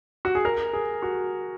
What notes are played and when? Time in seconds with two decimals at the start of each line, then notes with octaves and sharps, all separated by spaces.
0.25 F#4
0.35 G#4
0.45 A#4
0.73 G#4
1.02 F#4